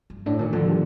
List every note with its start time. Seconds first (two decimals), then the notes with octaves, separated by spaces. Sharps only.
0.10 G2
0.26 A2 D4
0.39 A#2 D#3
0.53 D3 F3
0.66 A#2 G3